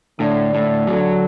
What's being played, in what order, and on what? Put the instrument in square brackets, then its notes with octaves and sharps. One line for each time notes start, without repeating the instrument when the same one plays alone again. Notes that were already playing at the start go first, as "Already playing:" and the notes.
[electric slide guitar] A2 [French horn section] D3
[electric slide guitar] A2
[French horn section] D3 [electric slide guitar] F#3